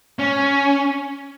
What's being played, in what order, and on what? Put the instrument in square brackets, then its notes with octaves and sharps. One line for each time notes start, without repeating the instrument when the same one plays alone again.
[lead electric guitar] C#4